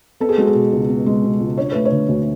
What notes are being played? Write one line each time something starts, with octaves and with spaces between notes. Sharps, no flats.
B3 A4
G#4
G#3 F#4
G#4
B2
C#2
B3
G#3
B2
C#2
D4 C#5
A3 B4
C#5
D3
D2